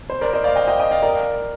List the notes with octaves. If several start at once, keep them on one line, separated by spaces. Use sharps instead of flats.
C5
A#4 D5
C5 D#5
D5 F5
D#5 G5
D#5 G5
D#5 G5
D5 F5
A#4 D5